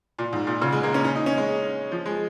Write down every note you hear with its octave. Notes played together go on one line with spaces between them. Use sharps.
A#2
G#2
A#2
C#3
G#3
A#3
C#4
C#4
D#4
C#4
G#3
F3
G#3